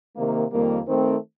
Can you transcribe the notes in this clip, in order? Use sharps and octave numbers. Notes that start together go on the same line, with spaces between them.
C3 D#3 A#3
F2 D#3 G3 A#3
D#3 A3 C4